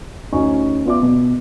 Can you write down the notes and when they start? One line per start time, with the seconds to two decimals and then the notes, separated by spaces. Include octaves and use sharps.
0.32 D2 C#4 D#4 D#5 G#5 C#6
0.85 B3 F4 D5 E5 D6
1.03 B2